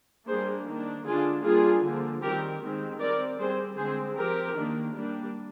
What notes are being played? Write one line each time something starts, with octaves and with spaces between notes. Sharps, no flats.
G3 A#3 D4 G#4 C5
D#3 A#3 D4
D3 G#3 D4 F4 G#4
G3 A#3 D4 F4 G#4
D3 F3 A#3
D#3 G3 C4 G4 A#4
D#3 G#3 C4
G3 C4 A#4 D5
G3 C4 G#4 C5
D3 G#3 C4 G#4 C5
F3 C4 G4 A#4
D#3 A#3 D4
G3 A#3 D4